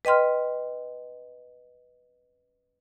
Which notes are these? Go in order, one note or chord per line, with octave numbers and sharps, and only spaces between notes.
B4 D#5 G5 C6 F6